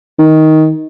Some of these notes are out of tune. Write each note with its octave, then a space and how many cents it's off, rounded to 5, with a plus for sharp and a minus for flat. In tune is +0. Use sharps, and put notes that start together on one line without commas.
D#3 +10